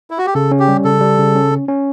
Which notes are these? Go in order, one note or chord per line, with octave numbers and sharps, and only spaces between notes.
E4
F#4
G4
C#3 A4
C#4
G4
G3
C#3 A4
G3
C#3
C#4
C#4
C#4